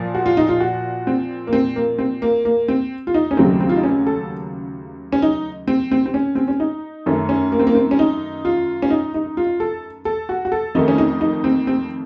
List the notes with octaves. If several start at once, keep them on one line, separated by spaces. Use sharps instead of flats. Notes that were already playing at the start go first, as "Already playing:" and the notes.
Already playing: A#2 F3
F#4
F4
D#4
F4
F#4
C4
A#3
C4
A#3
C4
A#3
A#3
C4
F4
D#4
C#4
D#2 C#3 F#3 A3 C4
C4
F4
D#4
C#4
A4
C#4
D#4
C4
C4
C4
C#4
C4
C#4
D#4
F#2 D#3 A3 C#4
C#4
A#3
C4
A#3
C4
C#4
D#4
F4
C#4
D#4
D#4
F4
A4
A4
F#4
F#4
A4
F2 D#3 A3 D#4
C#4
D#4
D#4
C4
C4